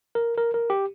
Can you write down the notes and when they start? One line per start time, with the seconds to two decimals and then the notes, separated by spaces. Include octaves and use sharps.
0.15 A#4
0.37 A#4
0.54 A#4
0.70 G4